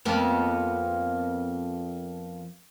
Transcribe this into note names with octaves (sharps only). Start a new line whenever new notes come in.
F2 A#3 B3